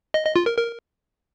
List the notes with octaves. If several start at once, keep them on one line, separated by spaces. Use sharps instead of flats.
D#5
D#5
F4
A#4
A#4